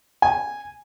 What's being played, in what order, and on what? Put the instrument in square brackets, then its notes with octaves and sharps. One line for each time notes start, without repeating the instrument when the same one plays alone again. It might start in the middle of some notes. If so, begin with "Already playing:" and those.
[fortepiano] G#5